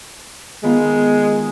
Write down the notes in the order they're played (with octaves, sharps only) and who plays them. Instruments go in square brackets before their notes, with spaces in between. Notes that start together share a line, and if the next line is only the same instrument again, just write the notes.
[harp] D#3 B3 F4 [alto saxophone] G#3